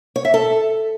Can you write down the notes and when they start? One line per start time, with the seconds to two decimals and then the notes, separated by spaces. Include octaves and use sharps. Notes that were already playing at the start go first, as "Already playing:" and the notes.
0.16 C#5
0.25 E5
0.34 A4